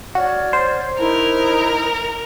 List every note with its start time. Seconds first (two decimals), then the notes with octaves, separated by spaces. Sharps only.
0.15 F#4 C#5 D5 F6
0.53 C5
0.98 D#4 E4 A#4